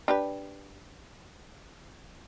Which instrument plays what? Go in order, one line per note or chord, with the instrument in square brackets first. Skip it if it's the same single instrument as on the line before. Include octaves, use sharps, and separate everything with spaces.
[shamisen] D4 G4 B4